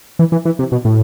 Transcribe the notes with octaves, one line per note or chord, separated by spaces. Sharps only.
E3
E3
E3
C3
B2
A2